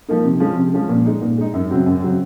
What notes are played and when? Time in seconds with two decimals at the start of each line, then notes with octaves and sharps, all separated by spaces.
0.08 F3 A#3 D#4
0.24 C3
0.40 F3 G#3 C#4
0.56 C3
0.73 F3 G#3 C#4
0.89 A#2
1.05 G#3 D#4
1.22 A#2
1.38 G#3 D#4
1.54 F#2
1.70 C#3 F#3 C4
1.86 F#2
2.02 C#3 F#3 C4